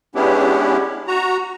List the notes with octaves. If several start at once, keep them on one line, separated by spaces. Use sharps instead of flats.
G#3 B3 C#4 D4 E4 G4
F#4 A#5